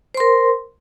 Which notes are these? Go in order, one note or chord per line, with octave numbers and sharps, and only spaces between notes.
A#4 C5 C6